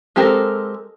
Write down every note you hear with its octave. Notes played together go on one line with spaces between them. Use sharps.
G#3 C4 G4 A4 A#4